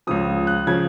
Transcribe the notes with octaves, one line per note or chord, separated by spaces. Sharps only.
C#2 C#3 F3 D#6
F#6
C#3 F3 G#6